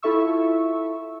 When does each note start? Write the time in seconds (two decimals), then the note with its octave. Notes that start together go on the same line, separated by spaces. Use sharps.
0.03 E4 F4 A4 E5 C#6 E6